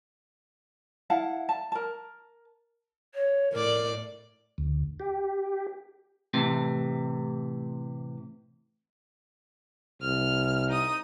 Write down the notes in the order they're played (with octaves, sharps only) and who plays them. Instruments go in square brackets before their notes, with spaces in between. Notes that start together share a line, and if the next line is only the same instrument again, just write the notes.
[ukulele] E4 F5 F#5 A5
A5
A#4 A5
[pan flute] C#5
[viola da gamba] A2 D5 [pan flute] A#4
[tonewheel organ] D2
G4
[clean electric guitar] A2 C3 E3
[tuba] C2 [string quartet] F6
[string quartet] D#4 D#6